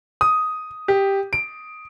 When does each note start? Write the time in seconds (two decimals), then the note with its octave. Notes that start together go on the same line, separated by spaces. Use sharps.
0.21 D#6
0.88 G4
1.33 D7